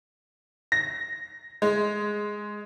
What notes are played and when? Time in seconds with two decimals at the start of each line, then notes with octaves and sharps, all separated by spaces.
0.72 A#6
1.62 G#3